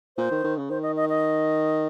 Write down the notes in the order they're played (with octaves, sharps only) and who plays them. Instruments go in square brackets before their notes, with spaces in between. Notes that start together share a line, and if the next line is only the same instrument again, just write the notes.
[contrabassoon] A#2 [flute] C5
[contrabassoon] D#3
D#3
C#3
[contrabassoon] D#3 [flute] C5
[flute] D#5
D#5
D#5